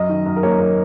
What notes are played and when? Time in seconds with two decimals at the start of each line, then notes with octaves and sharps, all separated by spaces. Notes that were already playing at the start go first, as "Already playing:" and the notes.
Already playing: F#2 D#5
0.09 D#3
0.26 F#2
0.36 A#4
0.43 A#3 C#5
0.59 A#3